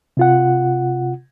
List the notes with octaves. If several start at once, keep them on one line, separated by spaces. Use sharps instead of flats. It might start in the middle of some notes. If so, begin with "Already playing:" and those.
C3 F4 F#5